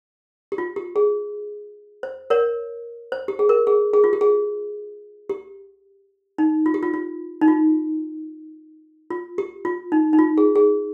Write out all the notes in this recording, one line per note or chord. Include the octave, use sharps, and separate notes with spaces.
G4
F4
G4
G#4
C5
A#4 C#5
C5
G4
G#4
A#4
G#4
G#4
F4
G4
G#4
G4
D#4
F4
G4
F4
F4
D#4
F4
F4
G4
F4
D#4
D#4
F4
G#4
G#4